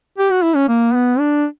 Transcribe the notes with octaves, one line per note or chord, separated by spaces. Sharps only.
G4
F#4
E4
C#4
A#3
B3
D4